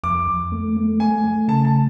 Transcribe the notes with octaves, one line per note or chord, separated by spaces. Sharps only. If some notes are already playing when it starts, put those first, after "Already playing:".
F2 D6
F2
A3
A3
A3 G#5
A3
C#3 A5
A5